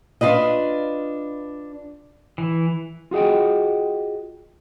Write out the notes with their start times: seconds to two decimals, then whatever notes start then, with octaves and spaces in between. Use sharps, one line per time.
0.21 D4 F4 B4 D#5
2.38 E3
3.11 F4 F#4 G#4 D#5 G5